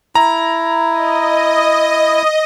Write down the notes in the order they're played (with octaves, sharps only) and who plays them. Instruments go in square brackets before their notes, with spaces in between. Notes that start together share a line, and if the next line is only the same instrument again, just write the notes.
[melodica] E4 [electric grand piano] A#5
[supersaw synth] D#5